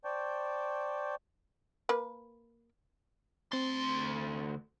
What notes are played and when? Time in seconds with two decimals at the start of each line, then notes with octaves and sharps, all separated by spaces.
0.05 C5 D5 G5 A5 C#6 G6
1.89 A#3 B4
3.52 D2 C4 C6 A6